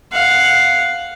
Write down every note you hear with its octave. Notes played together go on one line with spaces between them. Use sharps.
F5 F#5